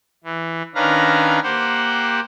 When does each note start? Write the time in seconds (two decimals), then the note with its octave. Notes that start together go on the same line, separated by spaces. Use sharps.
0.24 E3
0.75 D#3 C#4 D4 B4 F5 A#5
1.43 A#3 G4 C5 F#5